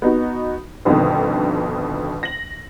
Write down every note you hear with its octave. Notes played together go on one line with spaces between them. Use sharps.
B3 D#4 F#4
G1 F2 B2 D3 D#3
A#6 F#7